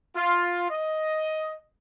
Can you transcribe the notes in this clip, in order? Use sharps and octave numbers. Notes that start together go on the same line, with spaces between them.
F4
D#5